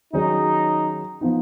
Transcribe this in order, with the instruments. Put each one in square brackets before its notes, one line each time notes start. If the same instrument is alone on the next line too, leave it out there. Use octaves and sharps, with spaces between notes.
[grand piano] D#3 F#3 C#4 G#4 [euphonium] D#4
[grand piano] F3 B3 D#4